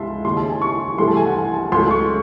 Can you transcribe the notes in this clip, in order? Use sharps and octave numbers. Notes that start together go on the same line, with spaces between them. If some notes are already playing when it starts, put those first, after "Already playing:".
Already playing: C#2 C3 E5 A5 C6
D#2 C#3 G#3 C6
A5
G#5
C#6
C2 C3 E3 A3 C6
A5
G#5
F#5
G#5
A5
C#2 C#3 F#3 A3 C6
C#6